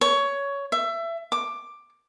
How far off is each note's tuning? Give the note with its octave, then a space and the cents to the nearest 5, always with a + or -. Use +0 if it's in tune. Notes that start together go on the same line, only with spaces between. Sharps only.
C#5 +15
E5 +25
D6 +10